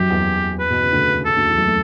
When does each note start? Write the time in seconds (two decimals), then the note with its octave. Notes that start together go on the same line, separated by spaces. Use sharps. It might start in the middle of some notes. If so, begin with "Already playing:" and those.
Already playing: F#2 F#3 G4
0.10 E2 E3
0.59 B4
0.70 B2
0.82 C#3
0.92 D2 D3
1.09 C#3
1.25 C#3 A4
1.36 D2 D3
1.47 E2 E3
1.58 F#2 F#3
1.67 A2 A3